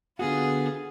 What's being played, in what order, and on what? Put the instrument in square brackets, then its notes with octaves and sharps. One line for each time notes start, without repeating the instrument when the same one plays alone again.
[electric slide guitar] D3 B3 F#4 [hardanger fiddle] F4 G#4